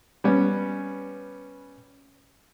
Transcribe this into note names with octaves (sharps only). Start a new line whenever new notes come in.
G3 B3 C#4